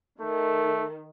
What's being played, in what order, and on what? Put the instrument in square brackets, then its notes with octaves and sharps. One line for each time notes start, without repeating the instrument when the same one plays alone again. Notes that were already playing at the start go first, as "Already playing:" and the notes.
[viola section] D#3 [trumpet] A3